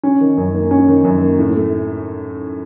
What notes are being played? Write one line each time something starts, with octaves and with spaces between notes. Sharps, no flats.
C#4
D#3
F#2
A#3
C#4
D#3
F#2
A#3
A2
A3